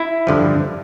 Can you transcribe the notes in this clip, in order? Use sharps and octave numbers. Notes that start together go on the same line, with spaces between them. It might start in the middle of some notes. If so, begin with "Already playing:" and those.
Already playing: E4
G2 D3 F3